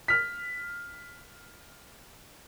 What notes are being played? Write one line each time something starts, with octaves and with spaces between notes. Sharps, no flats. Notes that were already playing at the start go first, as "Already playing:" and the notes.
F6 B6